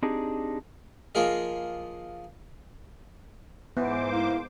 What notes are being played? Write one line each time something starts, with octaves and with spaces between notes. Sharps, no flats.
C4 D4 D#4 G4 G#4
F3 A#3 F4 G#4 A#4 D#5
G#2 E3 B3 C5 D6
A#3 E4